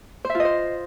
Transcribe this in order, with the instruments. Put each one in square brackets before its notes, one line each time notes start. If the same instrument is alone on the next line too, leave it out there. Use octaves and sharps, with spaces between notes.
[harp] C5
E5
F4
D#5
C5